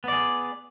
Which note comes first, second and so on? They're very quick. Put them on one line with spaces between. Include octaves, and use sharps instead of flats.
B3 D5 G#4